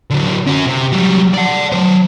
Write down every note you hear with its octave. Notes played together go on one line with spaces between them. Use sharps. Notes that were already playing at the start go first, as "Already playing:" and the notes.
D3 F#3
C#4 F#4
C3
F#3 G3
D5 F#5
F#3 C5